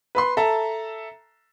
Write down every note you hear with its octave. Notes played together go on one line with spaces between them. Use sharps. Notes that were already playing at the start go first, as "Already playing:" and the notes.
B4 B5 C6
A4 E5 A5 A#5